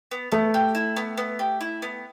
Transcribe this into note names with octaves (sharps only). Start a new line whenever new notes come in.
B3
A3 B3
G4
E4
B3
B3
G4
E4
B3